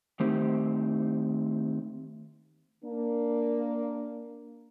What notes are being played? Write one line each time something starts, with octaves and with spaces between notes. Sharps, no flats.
D#3 A3 C4 D#4 G4 C5
A#3 D4